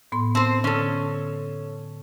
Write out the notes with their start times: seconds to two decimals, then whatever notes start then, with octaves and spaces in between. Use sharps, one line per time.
0.12 A2 B3 C6
0.35 C4 C5 A5
0.64 D3 C#4 A4